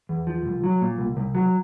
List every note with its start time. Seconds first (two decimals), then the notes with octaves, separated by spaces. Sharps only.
0.09 E2
0.27 F3
0.45 C2
0.64 F#3
0.82 A#2
0.98 C2
1.17 C2
1.35 F#3